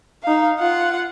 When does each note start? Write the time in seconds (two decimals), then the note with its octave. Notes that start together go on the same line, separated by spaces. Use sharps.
0.23 D#4 F5
0.59 F4 F#5